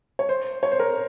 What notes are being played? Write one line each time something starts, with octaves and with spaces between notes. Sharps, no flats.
C#5
C5
C#5
C5
A#4